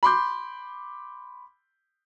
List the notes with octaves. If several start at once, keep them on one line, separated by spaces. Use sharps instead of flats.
B5 C6 D6 G6